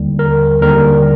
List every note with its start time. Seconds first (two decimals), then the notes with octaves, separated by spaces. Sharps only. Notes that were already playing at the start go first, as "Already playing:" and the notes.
Already playing: D#2 D3 G3
0.19 A#4
0.61 D#2 D3 G3 A#4